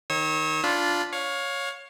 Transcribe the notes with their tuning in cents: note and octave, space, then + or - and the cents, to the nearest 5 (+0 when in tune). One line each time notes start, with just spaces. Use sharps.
D#3 +0 C#5 -30 E6 -45
D4 -10 F4 +0 B5 +0
C#5 +0 F5 +25